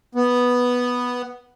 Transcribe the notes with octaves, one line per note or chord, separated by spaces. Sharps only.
B3